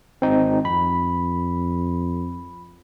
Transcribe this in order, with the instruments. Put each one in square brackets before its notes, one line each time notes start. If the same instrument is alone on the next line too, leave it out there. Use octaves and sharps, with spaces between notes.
[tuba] G#1 [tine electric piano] C4 D#4
[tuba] F2 [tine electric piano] B5